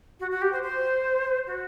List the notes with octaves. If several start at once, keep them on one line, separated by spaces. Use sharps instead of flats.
F#4
F#4
G4
C5
C5
F#4